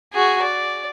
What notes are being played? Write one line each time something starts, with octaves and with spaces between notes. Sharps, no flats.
F#4 G#4
D5